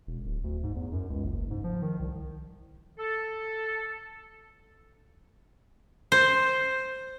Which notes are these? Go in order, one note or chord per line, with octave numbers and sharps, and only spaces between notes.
E1
D1
D2
G#2
E2
F#2
C#2
F#1
G#2
F3
D#3
C2
A4
C5